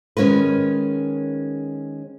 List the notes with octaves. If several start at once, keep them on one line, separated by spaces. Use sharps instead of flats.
D#3 G#3 C#4 A#4 B4